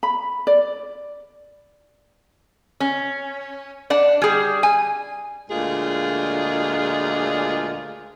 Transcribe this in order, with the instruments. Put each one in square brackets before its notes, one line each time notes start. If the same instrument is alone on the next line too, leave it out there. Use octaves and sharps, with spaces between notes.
[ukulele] B5
D5
[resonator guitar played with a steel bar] C#4
D4 D5 F#5
G3 G#4
G#5
[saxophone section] D2 A#2 G#3 F4 G#4